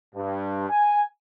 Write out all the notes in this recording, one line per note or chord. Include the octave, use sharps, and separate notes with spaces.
G2
G#5